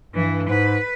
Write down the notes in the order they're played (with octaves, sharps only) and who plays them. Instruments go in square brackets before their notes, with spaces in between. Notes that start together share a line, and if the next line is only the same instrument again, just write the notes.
[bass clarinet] G2 [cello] E3
[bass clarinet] G#2 [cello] B4